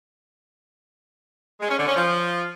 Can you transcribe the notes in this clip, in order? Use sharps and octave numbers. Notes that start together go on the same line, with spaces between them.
G#3
C#4
D3
C#4
F3